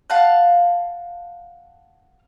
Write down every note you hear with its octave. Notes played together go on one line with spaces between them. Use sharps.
F5 F#5 A5 F#6